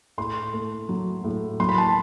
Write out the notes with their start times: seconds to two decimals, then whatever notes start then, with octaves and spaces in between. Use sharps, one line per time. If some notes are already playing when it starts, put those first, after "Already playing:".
0.18 A2 C6
0.53 A3
0.89 F#3
1.24 A2
1.60 F#3 C6
1.69 B5
1.78 A5